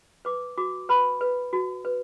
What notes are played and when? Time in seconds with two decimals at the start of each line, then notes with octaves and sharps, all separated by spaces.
0.25 B4 D6
0.58 F#4 D6
0.89 B4 B5
1.21 B4
1.53 F#4
1.85 B4